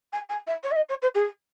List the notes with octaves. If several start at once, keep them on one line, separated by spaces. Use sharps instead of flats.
G#5
G#5
E5
C#5
E5
D#5
C#5
C5
G#4